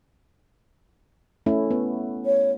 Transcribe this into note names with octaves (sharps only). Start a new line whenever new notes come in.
A3 C#4 E4
B3
C#5